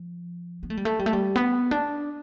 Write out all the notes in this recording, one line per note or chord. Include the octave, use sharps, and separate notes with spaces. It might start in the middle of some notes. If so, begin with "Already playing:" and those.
Already playing: F3
B3
A3
G3
A3
G3
A3
G3
B3
D4